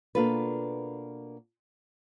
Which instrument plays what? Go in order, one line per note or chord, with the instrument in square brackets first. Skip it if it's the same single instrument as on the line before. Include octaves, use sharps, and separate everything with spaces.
[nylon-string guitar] B2 A#3 D4 F4 A4 B4